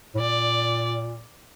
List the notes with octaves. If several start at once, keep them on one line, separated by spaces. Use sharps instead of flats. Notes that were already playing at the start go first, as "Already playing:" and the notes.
A2
A#2 D5